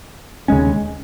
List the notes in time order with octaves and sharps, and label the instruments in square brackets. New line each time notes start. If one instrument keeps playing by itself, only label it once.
[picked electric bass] D#2 C#3 G#3 C#4